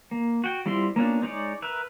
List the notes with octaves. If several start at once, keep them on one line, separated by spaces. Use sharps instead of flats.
A#3
F#4 G5
G3 C4 E4 F4 C6
A#3 B3 C#4 D4 F4
G#3 D#4 C#5 D5
A#4 B4 E5